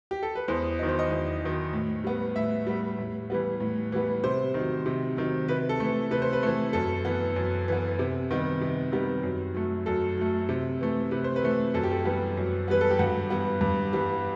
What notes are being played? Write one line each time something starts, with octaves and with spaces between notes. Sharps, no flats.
G4
A4
B4
E2 C5
D#3 F#3 D#5
C5
D#5
E2
D#3 F#3
A2
G3 B3
A2 E5
G3 B3
A2
E3 G3 B3
A2
E3 G3 B3
C3 C5
D#3 F#3
C3
D#3 F#3
C3 B4
A4
E3 A3
C3 B4
C5
B4
E3 A3
F#2 A4
E3 B3
F#2
E3 B3
C3
D#3 G3 B3
C3
D#3 G3 B3
F#2
F#3 A3
F#2 A4
F#3 A3
C3
E3 A3
C3 B4
C5
B4
E3 A3
F#2 A4
G4
A4
E3 G3 B3
F#2
E3 G3 B3 B4
A4
G4
G2 F#4
E3 G3 B3
G2
E3 G3 B3